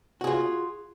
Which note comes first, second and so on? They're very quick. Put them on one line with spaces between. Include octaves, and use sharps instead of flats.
F#4 G#4 F4